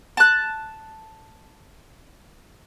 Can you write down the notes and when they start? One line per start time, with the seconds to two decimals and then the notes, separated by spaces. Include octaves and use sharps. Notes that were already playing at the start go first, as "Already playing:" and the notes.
0.17 A5 F#6